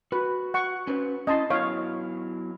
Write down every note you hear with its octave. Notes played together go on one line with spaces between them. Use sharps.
F#4 B4
F#5 C#6
C#4 B4 C5
C#4 D#4 E4 D#5 A5 C6
F#3 B3 E4 C#5 F5